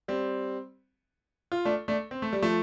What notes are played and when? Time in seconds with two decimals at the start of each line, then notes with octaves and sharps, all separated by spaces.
0.08 G3 C4
1.52 F4
1.65 A3 D4
1.88 A3 D4
2.11 C4
2.22 A3
2.33 G3
2.42 F3 A3